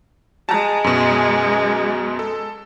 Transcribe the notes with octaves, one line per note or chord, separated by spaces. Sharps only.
G#3 A5 A#5
F#2 B2
A4